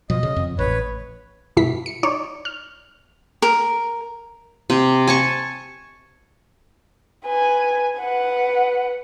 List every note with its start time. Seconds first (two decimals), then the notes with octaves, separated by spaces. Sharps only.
0.10 B2 F3 D#5
0.23 C#3
0.36 F2
0.59 A1 B4 C#5
1.57 G2 B2 E4 B6
1.86 C#7
2.03 D#4 C#5 D5
2.45 F6
3.42 A#4
4.70 C3
5.07 G#5 A5 C#6
7.26 B4 G#5
8.00 B4 F#5